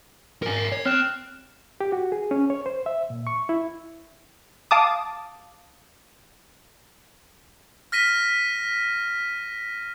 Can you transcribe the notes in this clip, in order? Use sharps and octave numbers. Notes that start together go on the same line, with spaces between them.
A#4 G#5
C7
C#5
C4 F6 F#6 E7
G4
F#4
G#4
C#4
C#5
C5
E5
A#2
C#6
E4
F5 A5 D6 D#6
F6 A#6 B6 D#7